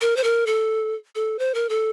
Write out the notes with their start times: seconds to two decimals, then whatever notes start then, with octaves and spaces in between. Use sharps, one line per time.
0.01 A#4
0.16 C5
0.24 A#4
0.46 A4
1.15 A4
1.39 C5
1.54 A#4
1.69 A4